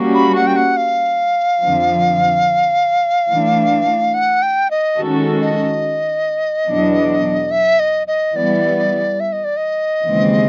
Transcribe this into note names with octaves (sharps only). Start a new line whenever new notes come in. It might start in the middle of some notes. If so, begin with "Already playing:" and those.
Already playing: G3 A#3 C#4 F#4
B5
F#5
G5
F#5
F5
F2 D3 F3
E3 A3 D4
F#5
G5
D#5
D#3 G#3 C#4 F#4 A4
D#5
E2 B2 F#3 B3 D4
E5
D#5
D#5
E3 G3 B3 D5
E5
D#5
D5
D#5
D#2 C#3 E3 G#3 C4